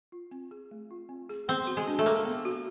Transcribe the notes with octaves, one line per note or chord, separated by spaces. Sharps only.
F4
C4
G#4
A3
F4
C4
G#4
B3 C4
F#4
G#3
D4
A3
A#3 A4
B3
F#4